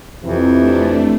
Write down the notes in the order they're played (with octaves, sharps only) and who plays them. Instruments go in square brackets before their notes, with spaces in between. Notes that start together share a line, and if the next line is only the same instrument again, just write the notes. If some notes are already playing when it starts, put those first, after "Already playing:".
[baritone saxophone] F2 [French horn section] C3 E3
[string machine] A3 D4